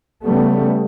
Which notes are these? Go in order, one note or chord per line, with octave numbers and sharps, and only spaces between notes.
C#3 G3 A3 B3